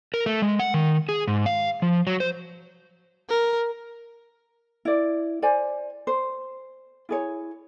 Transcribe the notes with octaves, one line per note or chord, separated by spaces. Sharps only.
A#4
A3
G#3
F#5
D#3
G#4
G#2
F5
F3
F#3
C5
A#4
E4 D5
C5 D5 G#5
C5
E4 G#4 C#5